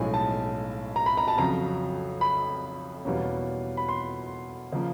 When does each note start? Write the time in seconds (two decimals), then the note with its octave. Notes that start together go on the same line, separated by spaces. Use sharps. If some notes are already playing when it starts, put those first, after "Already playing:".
Already playing: B1 A2 F3 G#3 C#4 G#5
0.14 A5
0.96 A#5
1.06 B5
1.17 A#5
1.28 A5
1.37 F2 C#3 F#3 A#5
2.21 B5
3.05 E2 B2 G3 A#3 C#4
3.77 B5
3.89 C6
4.72 C#3 F3 A#3